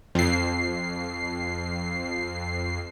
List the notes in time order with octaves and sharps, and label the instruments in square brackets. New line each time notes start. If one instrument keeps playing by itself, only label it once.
[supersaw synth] F2 C7